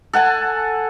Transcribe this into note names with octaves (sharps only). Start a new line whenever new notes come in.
A4 F#5 G#5 A5